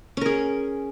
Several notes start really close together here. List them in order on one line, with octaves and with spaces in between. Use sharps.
C#4 A#4 G#4